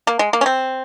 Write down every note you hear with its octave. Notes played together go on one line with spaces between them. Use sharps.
A#3
G#3
A#3
C#4
C4